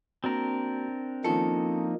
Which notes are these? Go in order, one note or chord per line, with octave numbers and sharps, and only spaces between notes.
A#3 C4 D4 F#4 A#4
D#3 F3 A#3 C#4 D#4 F4 A4 C#7